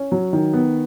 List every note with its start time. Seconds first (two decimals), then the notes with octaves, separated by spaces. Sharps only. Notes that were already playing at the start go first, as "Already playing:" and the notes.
Already playing: C#4
0.12 F#3
0.33 D#3
0.53 B3